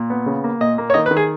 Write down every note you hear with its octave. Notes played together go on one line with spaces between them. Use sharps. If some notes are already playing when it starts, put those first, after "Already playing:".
Already playing: A#2
B3
C#3
A#3
A#2 D#5
A#3
C#5
D#3 D#5
B4
D#3
G#4